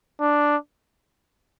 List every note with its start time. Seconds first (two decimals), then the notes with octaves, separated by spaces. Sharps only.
0.20 D4